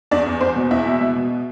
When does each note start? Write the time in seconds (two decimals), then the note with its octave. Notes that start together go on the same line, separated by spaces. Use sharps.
0.11 E2 D4 D5
0.26 E2
0.41 E2 C4 C5
0.56 B2
0.71 E2 E4 E5
0.86 B2
1.01 B2
1.16 B2